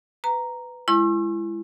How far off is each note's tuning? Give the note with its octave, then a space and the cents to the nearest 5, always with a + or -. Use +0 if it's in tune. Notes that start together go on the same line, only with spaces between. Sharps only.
B4 +15 A#5 +0
G#3 +0 E4 +30 C#6 -45